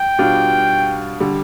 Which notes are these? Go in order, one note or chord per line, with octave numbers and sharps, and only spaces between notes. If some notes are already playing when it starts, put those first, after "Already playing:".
Already playing: G5
B2 G3 D4 F4
D3 G3